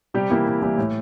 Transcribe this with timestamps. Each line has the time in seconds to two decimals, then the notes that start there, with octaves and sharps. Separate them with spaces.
0.14 C3 G3 G4
0.30 E3 G3 A#3 E4
0.46 C3
0.62 E3 G3 A#3 E4
0.78 A2